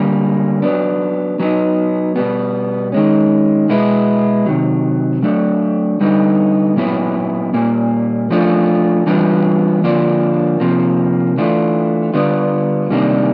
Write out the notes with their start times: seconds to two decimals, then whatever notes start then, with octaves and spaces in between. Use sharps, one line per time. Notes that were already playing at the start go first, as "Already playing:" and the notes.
Already playing: D3 G3 A#3
0.62 F#3 B3 D4
1.40 F#3 B3 D#4
2.16 B2 G3 B3
2.92 D#3 G#3 C#4
3.69 B2 G#3 B3 E4
4.46 C3 D#3 F#3
5.23 F#3 A3 D4
6.01 D3 G3 B3 D#4
6.76 A#2 F#3 B3 E4
7.54 A#2 G3 A#3
8.31 F3 A3 D4 F4
9.06 E3 G3 B3 D4 F4
9.84 D3 F3 A#3 D4 F4
10.60 C3 F3 A#3
11.38 E3 A3 D4 F4
12.14 D3 G3 B3 D4 F4
12.90 C3 D#3 G3 A#3 D4